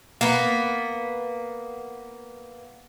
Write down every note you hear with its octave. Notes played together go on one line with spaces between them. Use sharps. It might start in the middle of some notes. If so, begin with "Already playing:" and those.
A#3 B3